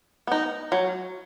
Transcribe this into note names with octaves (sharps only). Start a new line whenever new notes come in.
B3 D#4
F#3